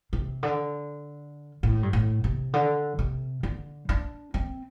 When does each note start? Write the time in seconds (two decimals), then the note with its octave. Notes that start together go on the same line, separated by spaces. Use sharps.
0.13 C3
0.43 D3
1.63 A2
1.83 G2
1.93 A2
2.24 C3
2.53 D3
2.99 C3
3.43 D3
3.89 D4
4.34 C4